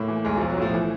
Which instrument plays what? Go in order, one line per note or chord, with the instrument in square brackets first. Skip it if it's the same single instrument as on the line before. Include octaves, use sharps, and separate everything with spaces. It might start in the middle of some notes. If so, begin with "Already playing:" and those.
Already playing: [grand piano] A2 A#3
E3
B1 G#3
B1 F3
F#3
A2 F3
E3